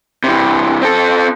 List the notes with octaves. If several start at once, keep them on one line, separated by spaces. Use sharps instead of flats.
C3 E3
C4 A4